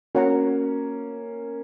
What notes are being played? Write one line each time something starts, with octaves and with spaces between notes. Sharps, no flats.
A#3 C#4 F#4 C#5 F#5 A#5